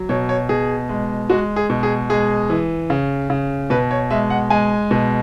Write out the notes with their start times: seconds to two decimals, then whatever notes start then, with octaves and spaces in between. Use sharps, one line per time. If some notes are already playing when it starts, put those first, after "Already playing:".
Already playing: F#3
0.09 B2 C#5
0.29 C#5
0.49 B2 G#4
0.89 G#3
1.29 G#3 F#4
1.56 G#4
1.70 B2
1.83 G#4
2.10 G#3 G#4
2.50 E3
2.90 C#3
3.30 C#3
3.70 B2 B4
3.91 C#5
4.10 G#3 E5
4.30 F#5
4.50 G#3 G#5
4.91 B2